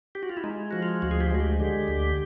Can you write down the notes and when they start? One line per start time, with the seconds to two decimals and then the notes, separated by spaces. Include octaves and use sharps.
0.15 G4
0.23 F#4
0.29 F4
0.37 E4
0.44 G#3 D#4
0.71 F3 F#4
0.83 F4
1.02 D2 F#4
1.11 G#4
1.21 G4
1.31 G#3 F#4
1.40 G4
1.60 D3 G4
1.88 D2